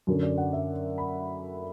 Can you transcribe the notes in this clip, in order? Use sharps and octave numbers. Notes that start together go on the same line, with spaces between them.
F#2 D3 F#3 C#4
D5
F#5
E5
B5